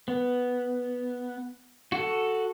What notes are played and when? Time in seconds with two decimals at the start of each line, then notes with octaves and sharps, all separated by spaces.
0.08 B3
1.92 F#4 A4